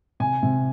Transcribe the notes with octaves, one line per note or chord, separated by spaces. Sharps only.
C3 G#5
C3